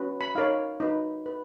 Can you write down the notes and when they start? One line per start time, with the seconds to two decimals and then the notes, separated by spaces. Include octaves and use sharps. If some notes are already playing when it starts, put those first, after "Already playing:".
Already playing: C#4 F#4 B4
0.21 B5
0.35 D#4 A#4 C#5 F5
0.80 D#4 F#4 B4
1.26 B4